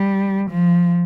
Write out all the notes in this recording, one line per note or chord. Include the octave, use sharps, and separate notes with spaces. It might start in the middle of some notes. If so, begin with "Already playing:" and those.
Already playing: G3
F3